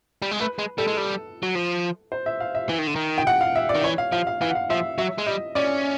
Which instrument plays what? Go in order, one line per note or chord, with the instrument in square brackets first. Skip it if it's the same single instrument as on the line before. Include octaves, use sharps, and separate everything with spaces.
[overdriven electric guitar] G3
G#3
[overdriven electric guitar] A3 [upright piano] B4
[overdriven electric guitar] G#3
[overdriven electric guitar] G3 [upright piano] A4
[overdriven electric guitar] G#3
G3
F#3
F3
[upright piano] C5
E5
F5
E5
[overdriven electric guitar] E3
D#3
D3
D#3
[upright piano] G5
F#5
F5
E5
D5
[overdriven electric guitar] D#3
[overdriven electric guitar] E3 [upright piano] C#5
[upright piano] F5
[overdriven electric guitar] F3 [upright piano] F5
[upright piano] F5
[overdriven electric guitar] E3 [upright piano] F5
[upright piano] F#5
F5
[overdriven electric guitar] F3 [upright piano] E5
[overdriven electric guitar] F#3 [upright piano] E5
[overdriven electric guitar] G#3
[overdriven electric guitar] G3 [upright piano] D#5
[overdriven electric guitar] C#4 [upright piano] D5